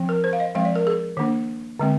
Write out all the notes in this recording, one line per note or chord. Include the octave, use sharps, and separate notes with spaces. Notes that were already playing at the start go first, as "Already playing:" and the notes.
Already playing: F3 C4
A#4
C5
F5
D#5
F3 G#3 C4 F5
D5
A#4
G#4
D#3 A#3 D4
D3 G#3 C4